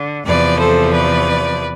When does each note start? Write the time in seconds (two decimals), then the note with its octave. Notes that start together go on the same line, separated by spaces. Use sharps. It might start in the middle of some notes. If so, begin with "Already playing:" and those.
Already playing: D3
0.25 E2 C3 F3 B4 D5
0.59 A4 C5
0.93 B4 D5